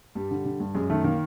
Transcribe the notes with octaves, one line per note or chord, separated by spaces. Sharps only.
G2 G3
D3
D3
G2
F#2 G#3
D#3 A3
D#3 A#3